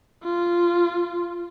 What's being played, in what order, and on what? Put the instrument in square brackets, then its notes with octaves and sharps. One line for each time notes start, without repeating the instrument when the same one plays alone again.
[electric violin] F4